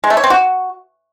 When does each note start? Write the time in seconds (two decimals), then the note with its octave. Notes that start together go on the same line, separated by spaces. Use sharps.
0.04 G#3
0.10 A3
0.17 C#5
0.24 C4
0.30 F#4